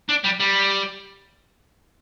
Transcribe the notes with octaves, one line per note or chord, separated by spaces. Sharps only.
D4
G3
G3